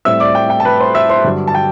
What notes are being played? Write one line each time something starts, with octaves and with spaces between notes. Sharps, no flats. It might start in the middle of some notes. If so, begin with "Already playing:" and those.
A2 G3 C4 E5 E6
D5 D6
G5
G5
A5
B4 B5
C5 C6
E5 E6
C5 C6
G2 D3 F#3
A5
G5